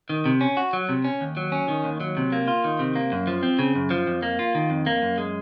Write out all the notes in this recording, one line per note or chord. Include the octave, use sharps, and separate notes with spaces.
D#3
C3
C#4
F#4
F#3
C3
C#4
D#2
F#3
C#4
D#3
D#2
F#3
C3
A#3
F4
D#3
C3
A#3
F#2
F3
C4
C#3
F#2
F3
F2
A#3
F4
D#3
F2
A#3
F#2
G#3